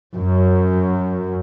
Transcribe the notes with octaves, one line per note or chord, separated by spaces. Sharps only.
F#2